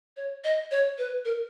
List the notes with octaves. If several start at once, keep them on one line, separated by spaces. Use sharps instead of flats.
C#5
D#5
C#5
B4
A#4